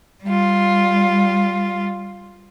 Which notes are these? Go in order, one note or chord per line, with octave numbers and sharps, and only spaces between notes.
G3 F4